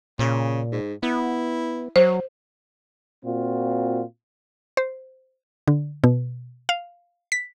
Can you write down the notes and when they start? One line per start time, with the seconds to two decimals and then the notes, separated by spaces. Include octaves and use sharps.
0.19 A#2 C#3
0.72 G#2
1.03 B3 E4
1.96 F#3 C5
3.25 A#2 C4 F4 F#4
4.77 C5
5.68 D3
6.04 B2
6.69 F5
7.32 B6